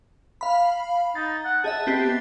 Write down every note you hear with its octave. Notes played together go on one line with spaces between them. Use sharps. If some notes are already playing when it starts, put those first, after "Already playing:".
F5 B5
D#4 A6
F#5
G#4 D#5 E5 A5
B3 C4 G4